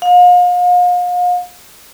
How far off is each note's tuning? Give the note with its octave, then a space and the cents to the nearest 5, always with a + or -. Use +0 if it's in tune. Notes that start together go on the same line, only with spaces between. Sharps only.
F5 +40